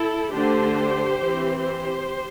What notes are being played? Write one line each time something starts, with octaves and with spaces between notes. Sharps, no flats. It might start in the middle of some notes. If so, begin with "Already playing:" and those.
Already playing: E4 A4
D3 A3 D4 G4 C5
E3 C4
G4 C5